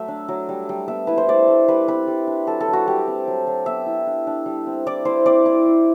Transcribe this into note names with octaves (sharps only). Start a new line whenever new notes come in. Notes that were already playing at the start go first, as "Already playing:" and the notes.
Already playing: F#3 A3 E5
D4
F#3
G3
G3
B3 E5
E4 B4
C5
A3 D5
A3
G3 B4
C4 B4
G3
D4
F#3 A4
A4
F#3
F#4
G3 G4
C4
F#3
F#3
B3 E5
E4
D4
D4
G3
C4
E4 D5
E4 C5
C4 D5
E4
E4